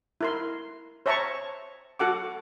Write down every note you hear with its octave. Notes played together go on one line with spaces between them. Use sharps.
E4 A#4 C6
C5 C#5 E5 A5 A#5 C#6
F#4 A4 F#5 D6